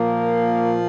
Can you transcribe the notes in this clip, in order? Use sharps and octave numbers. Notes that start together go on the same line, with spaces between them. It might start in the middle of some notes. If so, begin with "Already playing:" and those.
Already playing: A#2 F3 A#3